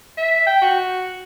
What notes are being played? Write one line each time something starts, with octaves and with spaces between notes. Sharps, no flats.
E5
G5
F#4